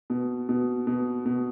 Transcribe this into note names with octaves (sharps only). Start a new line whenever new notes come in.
B2
B2
B2
B2